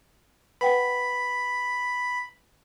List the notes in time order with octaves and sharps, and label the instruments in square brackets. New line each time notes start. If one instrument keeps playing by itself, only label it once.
[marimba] B4 F#5 G5 [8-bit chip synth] B5